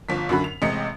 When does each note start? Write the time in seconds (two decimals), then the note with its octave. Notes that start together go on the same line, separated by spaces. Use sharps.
0.09 G1 F3 B6
0.29 F#2 D3 F#4 B5
0.44 F7
0.62 A1 C3 G#3 D#5 C#7